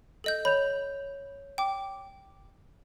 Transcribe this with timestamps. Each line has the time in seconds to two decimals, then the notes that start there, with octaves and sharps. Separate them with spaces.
0.24 A4 D#5 G6
0.45 C#5 B5 G6 F7
1.58 G5 D6